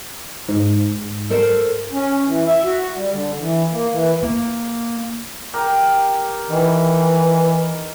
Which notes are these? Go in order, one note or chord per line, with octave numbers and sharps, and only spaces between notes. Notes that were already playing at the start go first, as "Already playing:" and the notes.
G#2
A4 A#4 C5
C#4
E3
E5
F#4
G3
D3
E3
A#3
E3
A#3
G4 A#4
D#3 E3